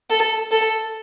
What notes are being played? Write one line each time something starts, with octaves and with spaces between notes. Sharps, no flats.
A4
A4